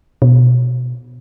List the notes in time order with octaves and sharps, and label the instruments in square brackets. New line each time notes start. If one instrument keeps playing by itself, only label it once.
[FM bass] B2